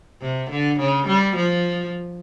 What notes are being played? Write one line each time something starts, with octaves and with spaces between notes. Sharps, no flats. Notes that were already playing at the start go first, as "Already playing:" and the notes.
C3
D3
C#3
G3
F3